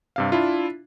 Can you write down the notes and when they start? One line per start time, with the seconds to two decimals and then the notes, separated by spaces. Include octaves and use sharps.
0.16 G2 C3 F5
0.32 D4 E4 F4